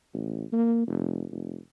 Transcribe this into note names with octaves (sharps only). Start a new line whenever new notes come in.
A1
A#3
F1
F1